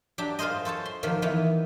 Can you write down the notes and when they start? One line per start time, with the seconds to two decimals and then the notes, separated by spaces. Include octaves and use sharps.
0.18 F#3 D4 G4
0.39 F4 G#4 A#4 C5 D#5
0.65 A4 C5 C#5 A5
0.85 C6
1.03 D#3 F3 F#3 A#3
1.22 D#3 E3 B3